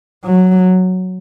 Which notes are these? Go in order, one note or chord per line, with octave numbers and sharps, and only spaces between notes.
F#3